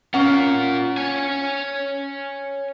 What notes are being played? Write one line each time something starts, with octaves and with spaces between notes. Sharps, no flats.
C#4 F4 A#4 F#5
C#5 G#5